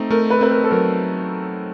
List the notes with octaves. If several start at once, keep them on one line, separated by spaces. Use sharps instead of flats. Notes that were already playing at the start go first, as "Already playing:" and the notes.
Already playing: A3 C4 D#4
A3 A#4
B4
C4 B4
A#4
A4
F#3 A#4